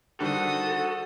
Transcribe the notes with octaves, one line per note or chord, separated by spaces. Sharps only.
D3 D#3 G3 F#4 A4 C5 D#6